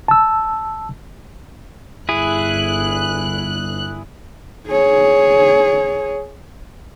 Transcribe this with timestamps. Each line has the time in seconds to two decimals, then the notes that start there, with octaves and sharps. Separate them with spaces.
0.08 A5 E6
2.09 G1 E4 G#4 F#6
4.68 G#4 C#5